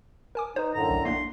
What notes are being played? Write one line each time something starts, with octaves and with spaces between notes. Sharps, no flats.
A#4 G#5 D6
D#4 B4 C5
F#2 A2 D3 A#5
B1
A3 A#3 D4 C6